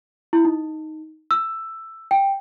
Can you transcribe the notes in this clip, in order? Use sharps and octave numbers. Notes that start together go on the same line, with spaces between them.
E4
D#4
E6
G5